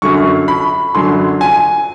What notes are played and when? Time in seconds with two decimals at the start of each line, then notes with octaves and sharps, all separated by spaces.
0.02 F#2 D3 F#3 C#6
0.48 B5
0.95 F#2 D3 F#3 C6
1.41 G#5